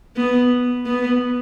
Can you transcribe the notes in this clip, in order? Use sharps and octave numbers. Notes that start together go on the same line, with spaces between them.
B3
B3